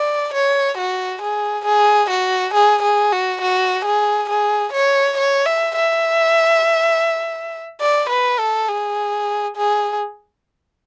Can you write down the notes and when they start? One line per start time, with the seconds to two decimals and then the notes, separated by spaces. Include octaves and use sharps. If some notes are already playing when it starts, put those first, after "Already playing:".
Already playing: D5
0.34 C#5
0.78 F#4
1.22 G#4
1.66 G#4
2.10 F#4
2.54 G#4
2.83 G#4
3.12 F#4
3.41 F#4
3.85 G#4
4.29 G#4
4.73 C#5
5.18 C#5
5.46 E5
5.76 E5
7.81 D5
8.10 B4
8.39 A4
8.69 G#4
9.57 G#4